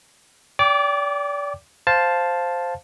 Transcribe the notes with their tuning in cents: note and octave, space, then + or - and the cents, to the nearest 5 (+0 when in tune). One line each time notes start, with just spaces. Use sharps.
D5 -35 G5 +0 D6 +0
C5 +0 F5 +5 A5 -5